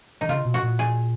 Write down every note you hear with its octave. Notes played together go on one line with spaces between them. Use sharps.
D#3 D#4
C#3 F4
B2
F#4
A#2
G#4